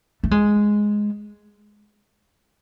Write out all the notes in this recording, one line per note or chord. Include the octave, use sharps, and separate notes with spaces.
A3
G#3